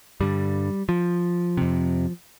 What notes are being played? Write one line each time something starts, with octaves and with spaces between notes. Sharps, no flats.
G2 D3 G3
F3
F2 C3